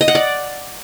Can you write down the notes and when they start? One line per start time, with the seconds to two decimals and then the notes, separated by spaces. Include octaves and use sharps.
0.01 D#5
0.08 F#5
0.15 D5